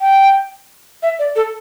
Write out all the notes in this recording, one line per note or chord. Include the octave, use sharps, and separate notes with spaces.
G5
E5
D5
A4